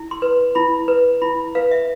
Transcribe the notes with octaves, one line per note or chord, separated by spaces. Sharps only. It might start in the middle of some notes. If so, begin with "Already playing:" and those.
Already playing: E4
C6
B4
E4 B5
B4
E4 B5
B4 F5
E5